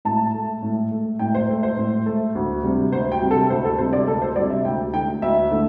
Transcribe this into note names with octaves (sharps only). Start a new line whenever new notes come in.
A2 A5
A3
A2
A3
A2 G5
C5
A3
C5
A2
A3
D2
C3 G3
D2 C5
G5
C3 G3
A4
D2 C5
A4
C3 G3 C5
D5
D2 A4
C5
C3 G3 D5
E5
D2 G5
D3 A3 G5
D2 E5
D3 A3